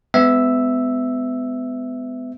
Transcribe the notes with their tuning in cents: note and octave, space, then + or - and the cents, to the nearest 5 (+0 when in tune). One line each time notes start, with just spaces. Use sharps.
G#3 +0 B3 +30 E5 +0